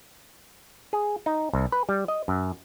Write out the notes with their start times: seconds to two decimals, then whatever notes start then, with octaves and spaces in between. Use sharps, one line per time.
0.93 G#4
1.26 D#4
1.53 C2
1.72 B4
1.89 G3
2.08 D#5
2.28 F#2